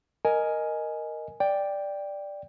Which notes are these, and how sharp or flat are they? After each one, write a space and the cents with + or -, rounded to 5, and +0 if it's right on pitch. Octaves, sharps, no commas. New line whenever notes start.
A#4 +0 D#5 +0 G#5 +5
D5 +0 G5 +5